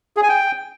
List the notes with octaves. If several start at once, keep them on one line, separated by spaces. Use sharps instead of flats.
G#4
G#5
G5